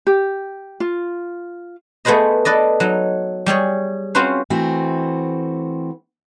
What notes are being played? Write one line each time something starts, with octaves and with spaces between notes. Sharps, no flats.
G4
F4
A3 B3 G#4 B4 C5 D#5
A4 B4 D5 D#5
F#3 D#4
G3 G4 G#4 C#5
C4 C#4 F4 F#4 B4 C5
E3 A3 C4 F#4